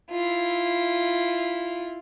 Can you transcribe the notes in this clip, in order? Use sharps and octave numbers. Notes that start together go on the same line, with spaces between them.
E4 F4